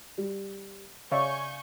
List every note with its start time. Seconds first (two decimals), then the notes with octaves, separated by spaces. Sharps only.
0.18 G3
1.12 C#3 C#5 D5 E5 F5 G#5 C#6 G6